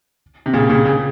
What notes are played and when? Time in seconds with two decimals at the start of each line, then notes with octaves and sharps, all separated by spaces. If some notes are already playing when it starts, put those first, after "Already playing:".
0.46 C3
0.53 A#2 C#3
0.69 A#2 C#3
0.85 A#2 C#3